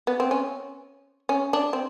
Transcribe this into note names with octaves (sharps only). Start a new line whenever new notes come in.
B3
C4
C#4
C#4
D4
C4